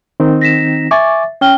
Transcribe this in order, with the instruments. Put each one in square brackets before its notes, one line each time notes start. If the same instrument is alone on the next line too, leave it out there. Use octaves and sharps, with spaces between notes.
[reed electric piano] D#3 C4 D#4
[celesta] A#6 B6 E7
[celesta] E5 A6 [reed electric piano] G#5 C#6 D6
[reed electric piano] C#4 [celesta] G5 F6 G7